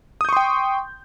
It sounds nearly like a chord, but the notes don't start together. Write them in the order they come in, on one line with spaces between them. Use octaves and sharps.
D#6 G6 C#6 C6 G5